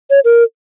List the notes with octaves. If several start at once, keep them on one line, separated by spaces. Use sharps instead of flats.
C#5
A#4